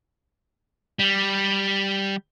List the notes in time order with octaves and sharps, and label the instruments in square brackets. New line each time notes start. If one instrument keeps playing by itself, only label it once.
[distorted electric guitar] G3